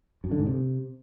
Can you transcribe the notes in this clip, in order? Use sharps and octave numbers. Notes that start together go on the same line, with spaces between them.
F#2
D3
G#2
C3